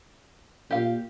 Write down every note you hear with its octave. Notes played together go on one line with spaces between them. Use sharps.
A#2 G4 F5